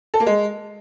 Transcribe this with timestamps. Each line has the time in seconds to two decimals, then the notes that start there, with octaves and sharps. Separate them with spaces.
0.14 A4
0.20 A#3
0.26 G#3